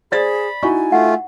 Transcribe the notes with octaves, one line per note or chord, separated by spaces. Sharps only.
G#4 C5 D5 B5 A6
D#4 E4 F#4 G#5 C#6
A3 F4 F#5